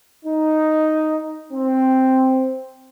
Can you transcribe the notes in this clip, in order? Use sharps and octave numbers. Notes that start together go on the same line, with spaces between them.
D#4
C4